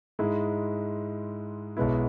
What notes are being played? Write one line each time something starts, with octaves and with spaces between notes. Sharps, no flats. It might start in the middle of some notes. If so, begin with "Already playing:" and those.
G#2 G#3 E4
B1 B2 G#3 B3 E4